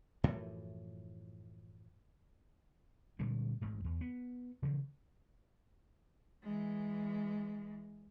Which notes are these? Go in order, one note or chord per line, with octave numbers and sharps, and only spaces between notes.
F#2 A2 E3 F3
A#2 D3 G3 G#3
A1 G#2
E2
B3
C#3 E3 F3
E3 G#3